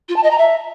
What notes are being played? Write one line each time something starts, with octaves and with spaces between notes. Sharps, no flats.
F4
A5
D#5
A#5
E5